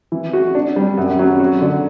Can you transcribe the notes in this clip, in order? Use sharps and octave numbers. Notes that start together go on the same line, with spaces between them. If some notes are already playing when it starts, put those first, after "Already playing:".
E3
F#4
D4
G3
F#2
F#3
F#4
D3